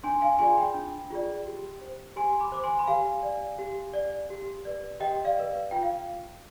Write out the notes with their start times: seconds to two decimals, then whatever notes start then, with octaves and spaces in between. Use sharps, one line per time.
0.04 D4 G#5 C6
0.21 F5 G#5
0.39 F4 G#4 D5 G#5 C6
0.57 G5 B5
0.74 D4
1.10 F4 G#4 D5
1.46 G4
1.81 C5
2.16 G4 G#5 C6
2.40 B5 D6
2.52 C5 D6
2.64 G#5 C6
2.79 B5
2.87 G4 F5 G#5
3.23 D5
3.59 G4
3.94 D5
4.30 G4
4.65 B4 D5
5.00 G4 D#5 G5
5.25 D5 F5
5.37 B4 D5
5.71 F4 G5
5.83 F5